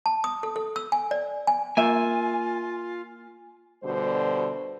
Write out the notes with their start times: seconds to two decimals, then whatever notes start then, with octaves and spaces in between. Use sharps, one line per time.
0.06 A5
0.24 D#6
0.43 A4
0.56 A4
0.76 E6
0.92 G#5
1.11 D5
1.47 G#5
1.77 A#3 F4 E5 G#5
3.84 D2 B2 D3 G3 C5